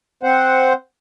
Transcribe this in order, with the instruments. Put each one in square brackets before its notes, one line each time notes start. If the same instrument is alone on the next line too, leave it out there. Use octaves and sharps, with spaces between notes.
[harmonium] C4 C5 F#5